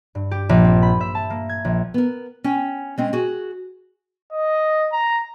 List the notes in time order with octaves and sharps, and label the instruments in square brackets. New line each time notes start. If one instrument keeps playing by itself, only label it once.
[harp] G2
G4
A#1
C4
B5
E5
A5
A#3
G#6
A#1
[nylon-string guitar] B3 A#4
C#4 G5 G#5
G#3 C4 C#4
F#4 G#4
[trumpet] D#5
A#5